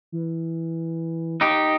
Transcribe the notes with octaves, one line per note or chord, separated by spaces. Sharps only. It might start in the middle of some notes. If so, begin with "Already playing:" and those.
E3
D#4 G4